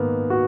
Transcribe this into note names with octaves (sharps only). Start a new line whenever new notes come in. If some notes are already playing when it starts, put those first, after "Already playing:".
Already playing: G#2 D#3 A#3 B3
F#4